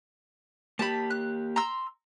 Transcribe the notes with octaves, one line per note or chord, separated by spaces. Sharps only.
A#3 G4 A5 B5
F#6
A#5 C6 E6